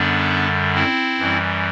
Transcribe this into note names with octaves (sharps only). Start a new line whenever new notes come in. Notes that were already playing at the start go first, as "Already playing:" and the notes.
Already playing: F#2 D3 G3 B3 D4
C4 E4
F#2 E3 G3